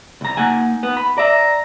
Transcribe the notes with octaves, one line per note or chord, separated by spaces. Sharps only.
C2 A#5
A#3 D#4 F#5 G#5
B3
B5
D5 E5 A#5